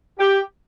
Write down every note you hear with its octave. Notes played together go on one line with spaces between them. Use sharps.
G4